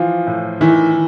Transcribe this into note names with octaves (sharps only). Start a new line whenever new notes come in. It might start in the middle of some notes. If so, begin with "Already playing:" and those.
Already playing: E3 F3 F4
A2
D#3 E3 E4